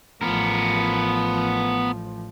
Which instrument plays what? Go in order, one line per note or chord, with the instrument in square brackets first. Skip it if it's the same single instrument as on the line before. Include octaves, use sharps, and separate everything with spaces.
[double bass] A1 F3 [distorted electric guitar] B3 A#4